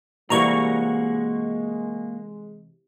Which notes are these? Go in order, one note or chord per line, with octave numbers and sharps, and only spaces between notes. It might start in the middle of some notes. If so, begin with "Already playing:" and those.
C3 E3 G3 G#3 A#3 F#4 A#5 C#6